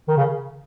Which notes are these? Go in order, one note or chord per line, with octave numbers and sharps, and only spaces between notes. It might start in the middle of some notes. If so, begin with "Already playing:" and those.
D#3
C#3